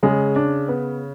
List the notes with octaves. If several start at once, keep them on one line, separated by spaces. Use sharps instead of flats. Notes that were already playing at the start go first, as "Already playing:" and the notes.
C#3 G#3
D4
B3